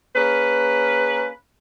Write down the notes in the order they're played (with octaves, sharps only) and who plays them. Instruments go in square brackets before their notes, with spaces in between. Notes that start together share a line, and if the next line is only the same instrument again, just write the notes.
[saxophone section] A#3 C#4 G#4 B4